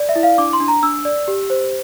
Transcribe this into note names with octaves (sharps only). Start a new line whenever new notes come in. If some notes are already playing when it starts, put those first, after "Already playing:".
Already playing: D5
E5
E4
F5
D4 D6
C6
D4
A#5
D4 E6
D5
G4
C5